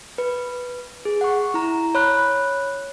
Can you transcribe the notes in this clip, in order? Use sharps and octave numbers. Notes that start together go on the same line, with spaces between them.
B4
G#4
F#5 C#6
E4 A#5
C#5 B5 F#6